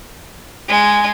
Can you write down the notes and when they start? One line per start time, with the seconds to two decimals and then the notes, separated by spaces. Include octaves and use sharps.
0.68 G#3